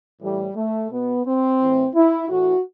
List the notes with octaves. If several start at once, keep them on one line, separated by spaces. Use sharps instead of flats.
A2 E3 G3
A3
B2 B3
C4
A2 E3
E4
A2 E3 F#4